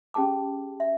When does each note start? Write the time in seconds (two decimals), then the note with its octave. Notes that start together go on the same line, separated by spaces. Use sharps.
0.14 C#4 G4 G#4 A5 D6
0.80 E5